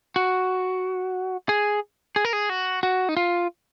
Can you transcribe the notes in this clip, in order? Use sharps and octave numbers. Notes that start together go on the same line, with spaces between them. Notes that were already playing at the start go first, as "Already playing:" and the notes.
F#4
G#4
G#4
A#4
G#4
F#4
F#4
D#4
F4